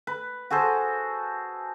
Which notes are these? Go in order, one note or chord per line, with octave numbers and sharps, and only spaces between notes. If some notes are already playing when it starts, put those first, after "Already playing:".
B4
F#4 G#4 A4 C5